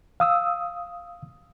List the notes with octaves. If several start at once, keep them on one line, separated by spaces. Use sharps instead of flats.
F5 D#6 E6